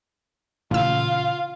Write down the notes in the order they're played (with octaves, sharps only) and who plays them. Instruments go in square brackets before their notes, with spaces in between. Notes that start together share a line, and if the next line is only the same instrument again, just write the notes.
[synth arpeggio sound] A1 E6 [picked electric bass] A#2 C#3 E3 [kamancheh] F4 F5